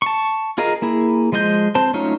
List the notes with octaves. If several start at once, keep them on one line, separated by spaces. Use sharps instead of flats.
A5 C#6
F4 G#4 A#4 D#5 F5
A#3 E4 G#4
F3 G#3 D#5 F5 G6
C4 C5 A5
F#3 A3 C#4 D#4 F4